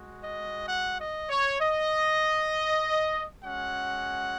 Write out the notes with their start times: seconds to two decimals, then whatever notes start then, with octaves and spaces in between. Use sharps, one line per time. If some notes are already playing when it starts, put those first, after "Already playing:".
Already playing: G#3 F#4
0.22 D#5
0.68 F#5
0.99 D#5
1.29 C#5
1.60 D#5
3.44 G#3 C#4 F#4 F#5